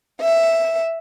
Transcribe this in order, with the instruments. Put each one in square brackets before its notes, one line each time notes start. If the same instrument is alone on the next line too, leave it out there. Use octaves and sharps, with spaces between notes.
[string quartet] E5